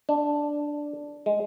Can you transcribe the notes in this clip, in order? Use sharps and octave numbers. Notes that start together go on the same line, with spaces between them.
D4
G#3